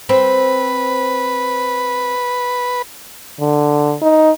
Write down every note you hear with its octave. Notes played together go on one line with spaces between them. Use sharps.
C4 B4
D3
D#4